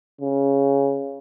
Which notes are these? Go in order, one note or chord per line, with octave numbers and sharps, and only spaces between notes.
C#3